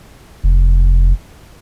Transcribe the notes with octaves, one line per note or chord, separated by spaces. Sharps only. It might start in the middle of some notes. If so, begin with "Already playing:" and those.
F1